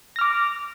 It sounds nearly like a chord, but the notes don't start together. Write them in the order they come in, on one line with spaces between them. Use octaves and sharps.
A#6 F6 D6